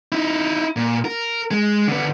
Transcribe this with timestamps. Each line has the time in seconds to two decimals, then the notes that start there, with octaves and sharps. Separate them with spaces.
0.12 D#4 E4
0.76 A#2
1.05 A#4
1.51 G#3
1.88 D3 B3